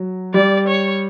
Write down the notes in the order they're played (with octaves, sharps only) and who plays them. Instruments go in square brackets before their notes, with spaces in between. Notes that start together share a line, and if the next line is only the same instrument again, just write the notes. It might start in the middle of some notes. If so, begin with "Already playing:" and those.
Already playing: [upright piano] F#3
[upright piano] G3 [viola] D5
[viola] C#5